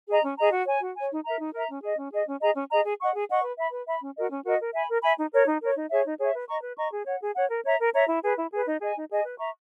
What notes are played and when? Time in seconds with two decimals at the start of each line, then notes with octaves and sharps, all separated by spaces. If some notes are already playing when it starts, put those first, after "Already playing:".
0.09 G#4 D#5 A#5
0.23 C#4
0.37 G#4 D#5 A#5
0.52 F#4
0.67 C#5 G#5
0.81 F#4
0.96 C#5 G#5
1.10 D#4
1.24 A#4 E5 A#5
1.39 D#4
1.54 A#4 E5 A#5
1.69 C#4
1.83 G#4 D#5
1.98 C#4
2.12 G#4 D#5
2.27 C#4
2.41 G#4 D#5 A#5
2.56 C#4
2.70 G#4 D#5 A#5
2.84 G#4
2.99 D#5 F#5 C#6
3.14 G#4
3.29 D#5 F#5 C#6
3.43 B4
3.57 E5 B5
3.72 B4
3.87 E5 B5
4.01 C#4
4.16 F#4 A#4 D#5
4.30 C#4
4.45 F#4 A#4 D#5
4.59 A#4
4.73 E5 G#5 B5
4.89 A#4
5.02 E5 G#5 B5
5.17 D#4
5.32 A#4 C#5
5.46 D#4
5.61 A#4 C#5
5.75 D#4
5.90 G#4 C#5 E5
6.05 D#4
6.19 G#4 C#5 E5
6.34 B4
6.48 D#5 A#5 C#6
6.63 B4
6.78 D#5 A#5 C#6
6.92 G#4
7.06 C#5 F#5
7.21 G#4
7.35 C#5 F#5
7.50 A#4
7.64 C#5 E5 A#5
7.79 A#4
7.94 C#5 E5 A#5
8.08 E4
8.22 G#4 B4
8.37 E4
8.52 G#4 B4
8.66 D#4
8.81 G#4 D#5 G#5
8.95 D#4
9.10 G#4 D#5 G#5
9.24 B4
9.39 E5 A#5 C#6